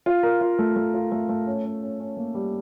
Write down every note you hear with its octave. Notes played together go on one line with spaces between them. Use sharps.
F4
A#4
F4
A3
A3
F4
A3
A3
C#4
C#4
C#4
C#4
A#3
G3